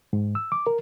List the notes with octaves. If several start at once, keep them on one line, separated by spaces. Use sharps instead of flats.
G#2
E6
D6
A#4